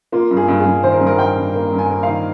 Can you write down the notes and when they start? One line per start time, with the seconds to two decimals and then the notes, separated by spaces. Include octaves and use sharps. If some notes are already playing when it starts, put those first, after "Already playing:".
0.12 A#3 F4
0.31 G2
0.37 G#4
0.48 G2
0.60 G#4
0.65 G2
0.83 D#3 C5
0.92 A#4
0.99 G2 G#4
1.07 A#4
1.19 G2 G5
1.38 G2
1.54 A#3
1.72 G2
1.78 G#5
1.90 A#3
2.03 D#3 F5